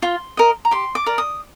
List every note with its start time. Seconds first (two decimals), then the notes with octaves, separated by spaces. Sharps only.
0.02 F4 C6
0.37 A#4 D#5
0.65 A#5
0.71 G4 C6
0.95 D6
1.06 A#4 D5
1.18 D#6